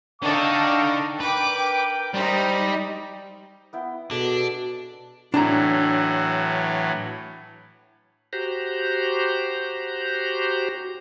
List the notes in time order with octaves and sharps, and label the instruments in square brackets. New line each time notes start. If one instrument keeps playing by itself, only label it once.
[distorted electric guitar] D3 A4 [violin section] D4 D#4 [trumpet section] F5 G5 C#6
[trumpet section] A#4 G5 [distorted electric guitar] B4 [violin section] D6
[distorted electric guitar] G3 [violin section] D#4 [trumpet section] C5
[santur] B3 E4 G5
[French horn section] B2 [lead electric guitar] D4 [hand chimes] F#4 G#4 A4
[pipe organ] A2 E3 F#3 [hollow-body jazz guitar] D4 A5 A#5
[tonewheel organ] F#4 G4 C5 A#5